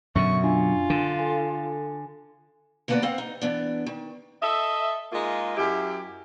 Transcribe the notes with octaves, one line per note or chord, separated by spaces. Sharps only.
F#2 B2 D3 E5 C#6
D4 F4 G#5
D3
A4 G#5
D3 A#3 B3 F#4 B4 D5
D2 C4 F5 F#5
D#4
E3 B3 D4
D#3
A4 D#5 E5
G#3 A#3 D#4 F4
F#2 E4 G4